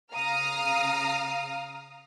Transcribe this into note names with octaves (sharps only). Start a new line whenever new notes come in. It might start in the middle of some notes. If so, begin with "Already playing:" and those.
C#3 F5 A#5 D#6 F6